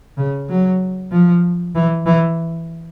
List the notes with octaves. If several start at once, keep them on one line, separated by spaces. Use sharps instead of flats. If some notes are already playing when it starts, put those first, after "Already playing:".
C#3
F#3
F3
E3
E3